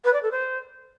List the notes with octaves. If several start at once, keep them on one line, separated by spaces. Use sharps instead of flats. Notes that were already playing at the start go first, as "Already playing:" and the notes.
B4
D5
A4
C5